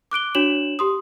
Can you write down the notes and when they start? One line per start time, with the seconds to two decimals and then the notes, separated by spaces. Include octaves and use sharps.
0.11 D6 F#6 D7 G7
0.35 D4 F#4 C#5 E7 F#7
0.79 G4 C6 D#6